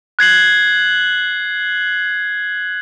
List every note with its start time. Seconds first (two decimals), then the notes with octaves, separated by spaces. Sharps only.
0.19 F#6 G#6 C7 F#7